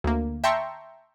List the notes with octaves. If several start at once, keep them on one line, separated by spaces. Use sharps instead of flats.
D2 A#3
E5 G5 A5 A#5 C6 C#6